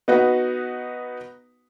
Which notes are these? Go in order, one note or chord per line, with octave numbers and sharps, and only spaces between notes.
B3 D#4 F#4 B4 F#5